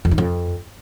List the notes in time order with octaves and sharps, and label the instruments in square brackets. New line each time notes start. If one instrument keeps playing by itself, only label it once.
[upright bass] F2
D#3
F2